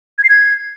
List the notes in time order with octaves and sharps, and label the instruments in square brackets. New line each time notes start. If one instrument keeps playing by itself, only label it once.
[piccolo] G#6
C7
G#6